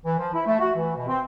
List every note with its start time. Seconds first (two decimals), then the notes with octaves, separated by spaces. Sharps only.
0.05 E3
0.19 F3
0.33 E4
0.46 A3
0.59 F#4
0.75 E3
0.96 B2
1.08 C4